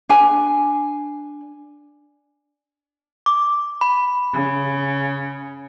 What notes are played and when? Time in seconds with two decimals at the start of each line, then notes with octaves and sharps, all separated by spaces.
0.09 D4 G#5
3.26 D6
3.81 B5
4.33 C#3